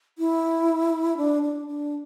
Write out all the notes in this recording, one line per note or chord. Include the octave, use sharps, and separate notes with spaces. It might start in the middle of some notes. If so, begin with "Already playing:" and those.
E4
D4
D4
D4